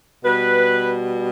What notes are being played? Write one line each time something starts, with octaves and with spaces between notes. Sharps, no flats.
B2 G3 B4